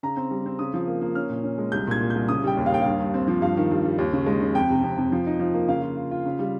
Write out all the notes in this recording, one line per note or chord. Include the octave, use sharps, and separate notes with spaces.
C#3 A#5
C4
G3
C4
C#3 D#6
F3
A#3
A#3
C#4 F6
A#2
C#4
G#3
C2 G6
A#2 G#6
A#2
C2 G6
C#3 D#6
G3 G5
D#2
F5
D#2 G5
G2 F5
G2
C4
F3
G2 F5
D#3
G2
G3
D#2
C#3
G#3
C#3
F2 G5
C3
F2
F2
F3
D#4
F3
A#3
C#3 F5
F4
F4
F4
C#3
G3